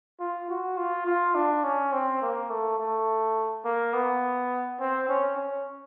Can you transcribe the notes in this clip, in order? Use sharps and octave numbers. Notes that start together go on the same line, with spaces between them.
F4
F#4
F4
F4
D4
C#4
C4
A#3
A3
A3
A#3
B3
C4
C#4
C#4